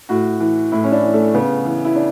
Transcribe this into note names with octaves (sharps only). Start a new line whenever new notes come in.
A2 F#4
E3
A2 E4
C#4
D4
E3
A3
C#3 B3
E3
E4
D4